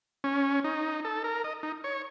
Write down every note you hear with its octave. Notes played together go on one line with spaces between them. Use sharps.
C#4
D#4
A4
A#4
D#5
D#4
C#5